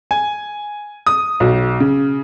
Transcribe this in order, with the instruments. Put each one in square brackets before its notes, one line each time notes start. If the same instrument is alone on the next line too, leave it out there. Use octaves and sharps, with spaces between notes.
[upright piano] G#5
D#6
B1
C#3